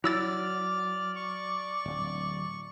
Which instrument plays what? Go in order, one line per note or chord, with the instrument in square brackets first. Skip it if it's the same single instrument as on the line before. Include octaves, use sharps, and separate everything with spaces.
[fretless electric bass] F#3 [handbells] E4 E6 A6 [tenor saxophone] D5 [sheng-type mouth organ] F6
[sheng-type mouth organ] C#6
[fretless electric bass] D1